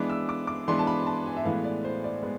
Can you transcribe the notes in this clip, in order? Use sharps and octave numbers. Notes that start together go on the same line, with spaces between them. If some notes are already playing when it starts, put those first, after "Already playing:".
Already playing: E3 G#3 B3 D4 D6
E6
D6
D6
E3 G#3 B3 D4 C6
A5
B5
A5
G#5
E5
A2 E3 G#3 B3 F5
D5
C5
D5
G#3 B3